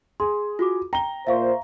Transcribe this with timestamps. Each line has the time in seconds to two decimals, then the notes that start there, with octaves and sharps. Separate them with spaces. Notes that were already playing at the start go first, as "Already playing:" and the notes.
0.20 G#4 C6
0.59 F4 F#4 D6
0.93 G5 A#5 G7
1.27 A#2 C5 E5 F5 C#6